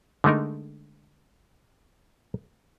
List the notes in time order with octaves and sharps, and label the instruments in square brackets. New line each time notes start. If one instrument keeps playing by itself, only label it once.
[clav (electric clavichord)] D3 G#3 A3 D#4 A#4